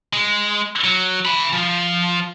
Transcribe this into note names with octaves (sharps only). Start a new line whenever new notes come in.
G#3
F#3
G#5 B5
F3